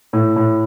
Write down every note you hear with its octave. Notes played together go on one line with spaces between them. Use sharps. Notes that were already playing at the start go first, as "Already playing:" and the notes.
A2
A2